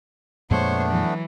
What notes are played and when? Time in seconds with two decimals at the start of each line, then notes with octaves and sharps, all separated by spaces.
0.51 F2 A#2 G#3 A3 B3 D4 C5 C#5
0.88 E3 F#3